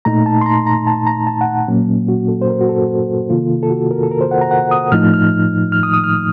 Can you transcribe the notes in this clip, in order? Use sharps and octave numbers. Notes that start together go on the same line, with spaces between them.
A#2 A3 D#4 A#5
A5
C6
A#5
A#5
A5
A#5
A5
F#5
A#2 F#3 A#3 C#4
F#4
A4
C5
A#4
F#4
A4
C3 D#3 A#3 F4
A4
F#4
A#4
A4
A#4
C5
F#5
A#5
F#5
D#6
A2 F3 A3 D#4 F6
F6
F6
D#6
D#6
F6